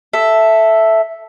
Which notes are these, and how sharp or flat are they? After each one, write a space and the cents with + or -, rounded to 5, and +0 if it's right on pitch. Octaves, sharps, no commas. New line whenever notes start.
A4 +0 E5 +0